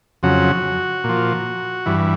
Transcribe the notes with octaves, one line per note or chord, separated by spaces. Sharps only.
F2 C#3 F#3 F#4
A#2 F3
G2 E3